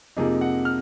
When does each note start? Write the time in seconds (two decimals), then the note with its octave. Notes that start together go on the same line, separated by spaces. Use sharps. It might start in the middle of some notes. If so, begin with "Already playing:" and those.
0.17 F2 C3 F3 A#3 D#4 G#4
0.41 F#5
0.65 F6